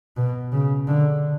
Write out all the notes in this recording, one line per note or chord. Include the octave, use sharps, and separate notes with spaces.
B2
C#3
D3